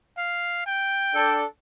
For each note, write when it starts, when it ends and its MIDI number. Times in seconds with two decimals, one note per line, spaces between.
0.18 0.63 77
0.66 1.42 79
1.14 1.43 62
1.14 1.43 69